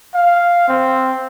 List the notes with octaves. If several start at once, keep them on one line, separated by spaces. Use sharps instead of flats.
F5
C4